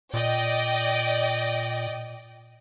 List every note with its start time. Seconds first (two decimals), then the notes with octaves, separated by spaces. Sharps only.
0.14 A#2 D5 D#5 G5